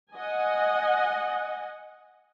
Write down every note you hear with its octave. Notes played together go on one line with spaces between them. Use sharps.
D#5 F#5 G#5